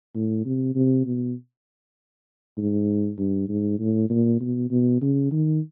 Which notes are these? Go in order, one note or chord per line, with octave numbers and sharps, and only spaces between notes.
A2
C3
C3
B2
G#2
G2
G#2
A2
A#2
B2
B2
C#3
D#3